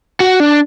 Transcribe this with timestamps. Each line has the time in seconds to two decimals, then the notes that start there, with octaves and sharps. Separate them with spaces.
0.20 F#4
0.40 D4